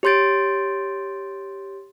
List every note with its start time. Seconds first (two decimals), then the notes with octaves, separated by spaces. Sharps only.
0.03 G4 C#5 C6 G6 A6 D7